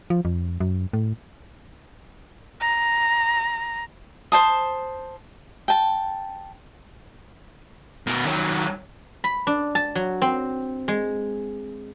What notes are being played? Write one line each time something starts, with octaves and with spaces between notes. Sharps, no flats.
F3
F2
F#2
A2
A#5
C5 A5 D#6
G5 A5
B2 A#4
D#3 F#3
B5
D4
A5
F#3
C4
G#3